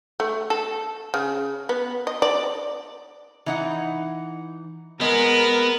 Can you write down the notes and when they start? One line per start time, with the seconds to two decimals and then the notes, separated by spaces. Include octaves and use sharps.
0.20 A3
0.50 A4
1.14 C#3
1.69 B3
2.07 D#5
2.22 D5
3.46 E3 D#4 F#5
5.01 G#3 B3 A#4